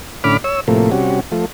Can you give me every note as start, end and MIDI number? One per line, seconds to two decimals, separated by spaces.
0.24 0.37 45
0.24 0.37 50
0.24 0.37 61
0.24 0.37 83
0.24 0.37 86
0.24 0.37 89
0.44 0.60 73
0.44 0.60 88
0.68 0.91 45
0.68 0.91 48
0.68 0.91 53
0.68 0.91 57
0.68 0.91 58
0.91 1.20 48
0.91 1.20 55
0.91 1.20 61
0.91 1.20 66
1.32 1.46 53
1.32 1.46 57